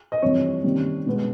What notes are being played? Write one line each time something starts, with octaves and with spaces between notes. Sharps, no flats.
D#5
F2 C3 E3 G3 C#5
C3 D#3 G3 A#3 C#4
B2 G#3 B3